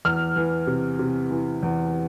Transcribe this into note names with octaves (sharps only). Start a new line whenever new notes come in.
E2 F6
E3
C3
C3
E3
E2